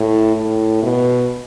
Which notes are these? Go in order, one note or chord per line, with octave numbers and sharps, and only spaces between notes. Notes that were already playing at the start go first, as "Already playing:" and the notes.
Already playing: A2
A2
B2